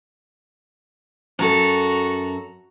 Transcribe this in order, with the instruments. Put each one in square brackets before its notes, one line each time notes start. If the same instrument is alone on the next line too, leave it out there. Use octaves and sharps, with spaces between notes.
[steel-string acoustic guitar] F#2 A4 [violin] F#4 A#5